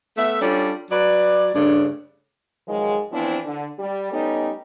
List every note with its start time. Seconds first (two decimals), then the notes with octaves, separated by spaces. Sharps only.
0.17 A3 B3 E5
0.40 G3 C#4 D4 F4 A4
0.91 F#3 B4 D5
1.54 G2 C#3 A3 D4
2.68 G#2 D#3 F3 F#3 G#3
3.12 E3 F3 B3 C4 D4 E4
3.46 D3
3.79 G3
4.12 G3 A3 B3 C#4 D#4